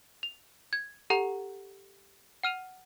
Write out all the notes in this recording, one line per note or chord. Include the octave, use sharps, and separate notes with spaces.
F7
G#6
G4 A4 F#5 A#5 F7
F#5 F6 D#7 F7